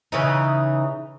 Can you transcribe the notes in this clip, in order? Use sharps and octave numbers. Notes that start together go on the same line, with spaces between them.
C#3 E3 D#4